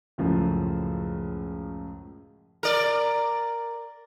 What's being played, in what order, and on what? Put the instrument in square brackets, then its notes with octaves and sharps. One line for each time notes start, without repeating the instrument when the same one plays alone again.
[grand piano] C#2 F#2 A2 C#3 F3
[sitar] A#4 D5